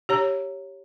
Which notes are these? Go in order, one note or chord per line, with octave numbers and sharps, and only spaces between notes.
G4 C#5 A#5